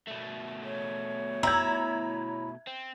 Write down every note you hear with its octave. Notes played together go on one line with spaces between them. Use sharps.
B2 A3
C#5
E4 A#5 G#6
C4